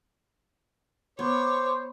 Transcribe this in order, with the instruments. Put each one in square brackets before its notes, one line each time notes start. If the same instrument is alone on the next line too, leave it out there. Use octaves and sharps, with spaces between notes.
[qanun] B3 [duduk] C5 [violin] C#5 [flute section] D6